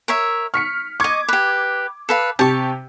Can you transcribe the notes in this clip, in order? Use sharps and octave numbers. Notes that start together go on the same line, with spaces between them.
A#4 C#5 E5
C#6 F6 B6 C#7
D#5 C#6 D6 G#6
G4 B4
A4 B4 F5
C3 G4 A5 C#6